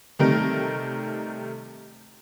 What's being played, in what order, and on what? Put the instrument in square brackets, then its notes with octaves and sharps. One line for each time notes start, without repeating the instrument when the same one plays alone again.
[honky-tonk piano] C3 D#3 G3 A3 A#4